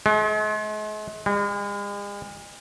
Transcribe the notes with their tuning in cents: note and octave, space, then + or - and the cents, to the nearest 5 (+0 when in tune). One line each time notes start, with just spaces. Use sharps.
G#3 +40
G#3 -45